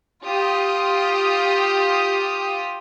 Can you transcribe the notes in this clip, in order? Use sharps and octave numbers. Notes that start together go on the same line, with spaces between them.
F4 G4 D#6